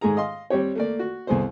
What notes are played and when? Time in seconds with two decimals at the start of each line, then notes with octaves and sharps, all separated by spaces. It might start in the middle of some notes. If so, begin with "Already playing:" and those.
0.01 G#2 G#3 A3 G#4 A#5
0.17 D#5 F5 C6
0.50 G3 C4 G4 C#5
0.75 A3 A#3 D5
0.99 F#4
1.27 C2 B3 G#4 A4 C5